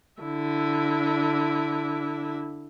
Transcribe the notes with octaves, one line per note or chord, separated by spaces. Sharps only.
D3 E4